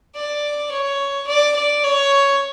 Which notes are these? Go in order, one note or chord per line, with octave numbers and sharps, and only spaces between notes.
D5
C#5
D5
D5
C#5